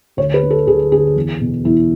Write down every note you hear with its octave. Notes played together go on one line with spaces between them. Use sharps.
D2 C#5
B4
D3
A4
D2 G#4
D3 G#4
E2
B2
E2 E4